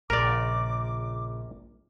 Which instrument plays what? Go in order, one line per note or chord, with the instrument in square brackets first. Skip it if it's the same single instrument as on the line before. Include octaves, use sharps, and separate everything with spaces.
[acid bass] A#1 [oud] A#2 C#3 [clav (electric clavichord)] A#4 D5 [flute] D6